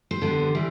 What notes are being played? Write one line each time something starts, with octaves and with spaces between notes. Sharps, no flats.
C5
D3 G3 B3
E3 G3